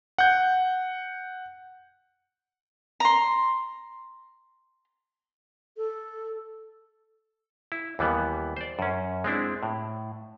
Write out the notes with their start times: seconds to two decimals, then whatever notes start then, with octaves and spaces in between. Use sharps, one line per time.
0.18 F#5 G6
3.00 A#5 C6
5.77 A4
7.72 E4
7.99 D#2 E3 G3 B3
8.57 C5 D5
8.79 F#2 C#4
9.24 G#3 C4 D4 E4
9.63 A2